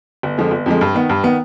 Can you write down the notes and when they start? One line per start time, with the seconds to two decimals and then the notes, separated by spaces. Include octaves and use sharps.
0.23 G1
0.37 F2 D3 F3 G#3
0.51 G1
0.66 F2 D3 F3 G#3
0.81 G2
0.95 D#3 B3
1.09 G2
1.23 D#3 B3